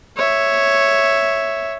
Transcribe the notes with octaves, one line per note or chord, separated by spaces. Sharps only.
C#5 E5